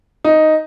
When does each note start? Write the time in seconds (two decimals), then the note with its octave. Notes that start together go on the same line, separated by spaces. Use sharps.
0.24 D#4